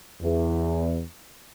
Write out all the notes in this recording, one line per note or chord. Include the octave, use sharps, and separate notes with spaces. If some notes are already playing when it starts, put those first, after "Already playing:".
E2